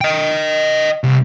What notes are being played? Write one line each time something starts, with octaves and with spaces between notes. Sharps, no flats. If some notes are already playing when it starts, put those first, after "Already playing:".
D#5 G5
C2